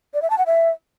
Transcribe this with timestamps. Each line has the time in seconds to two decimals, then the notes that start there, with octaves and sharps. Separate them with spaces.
0.14 D5
0.22 E5
0.30 A5
0.38 F#5
0.46 E5